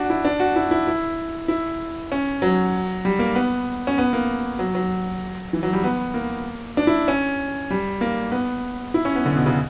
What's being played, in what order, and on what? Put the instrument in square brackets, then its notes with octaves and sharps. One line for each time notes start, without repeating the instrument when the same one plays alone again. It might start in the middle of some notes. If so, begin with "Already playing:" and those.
Already playing: [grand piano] D4 F#4
E4
D4
F#4
E4
E4
E4
E4
C#4
F#3
G3
A#3
B3
C#4
B3
A#3
F#3
F#3
E3
F#3
G3
B3
A#3
D4
E4
C#4
G3
A#3
B3
E4
C#4
B3
D3
B2
C#3